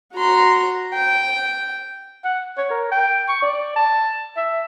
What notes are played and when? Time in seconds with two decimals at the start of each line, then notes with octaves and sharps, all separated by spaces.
0.15 F#4 A#5 C6
0.94 G5
2.24 F#5
2.57 C#5
2.70 A#4
2.91 G5
3.28 C#6
3.42 D5
3.76 A5
4.37 E5